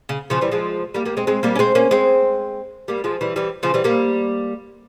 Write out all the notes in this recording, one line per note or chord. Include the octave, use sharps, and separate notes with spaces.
C#3
C#3 F3
E3 G3
F3 G#3
G3 A#3
G3 A#3
G#3 C4
G#3 C4
G3 A#3
C#4
G#3 C4
A#3 C#4
G#3 C4
G3 A#3
F3 G#3
E3 G3
E3 G3
C#3 F3
E3 G3
G3 A#3